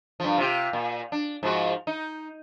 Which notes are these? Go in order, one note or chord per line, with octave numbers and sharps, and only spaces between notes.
G2 F3
C3 F4 G4
A#2
D4
G#2 F3 F#4
D#4